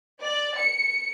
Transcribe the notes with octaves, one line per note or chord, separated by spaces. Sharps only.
D5
C#7